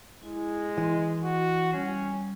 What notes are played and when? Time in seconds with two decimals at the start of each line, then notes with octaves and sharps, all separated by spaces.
0.23 G#3 E4
0.78 E3 D#5 C6
1.24 F#4
1.73 G3 C#4